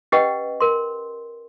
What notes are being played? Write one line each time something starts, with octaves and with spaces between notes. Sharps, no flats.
C#4 G4 B4 D#5 F#5 G5
A#4 C6